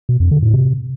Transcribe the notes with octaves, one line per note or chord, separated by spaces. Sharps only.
B2
F2
D3
A2
C3